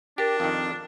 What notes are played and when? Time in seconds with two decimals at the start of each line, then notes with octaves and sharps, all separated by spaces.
0.18 D4 G4 A#4 A6
0.40 F2 D#3